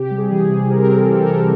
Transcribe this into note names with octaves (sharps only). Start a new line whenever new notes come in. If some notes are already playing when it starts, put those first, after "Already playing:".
Already playing: C3 G4
G3
G#4
E3
G#4
C3
C4 A#4
C4
A4
E3
A#4
A4
C3